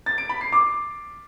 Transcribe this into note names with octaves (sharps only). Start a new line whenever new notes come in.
A6
D7
B5
C7
D6